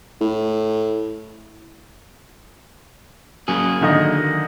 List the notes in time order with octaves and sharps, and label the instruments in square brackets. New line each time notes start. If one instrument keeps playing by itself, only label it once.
[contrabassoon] A2
[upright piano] C#3 [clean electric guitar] F#3 A#3 G#4
[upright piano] D3 D#3 D#5